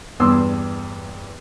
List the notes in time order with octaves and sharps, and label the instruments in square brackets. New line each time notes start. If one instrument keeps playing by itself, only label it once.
[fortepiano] E2 G2 C6 D6 E6